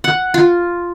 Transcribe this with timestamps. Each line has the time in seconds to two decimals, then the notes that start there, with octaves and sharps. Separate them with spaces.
0.04 F#5
0.34 F4